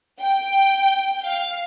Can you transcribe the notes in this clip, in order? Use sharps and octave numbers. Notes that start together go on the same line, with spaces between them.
G5
F5